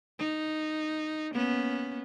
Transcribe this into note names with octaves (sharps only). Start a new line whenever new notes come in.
D#4
A#3 B3 C#4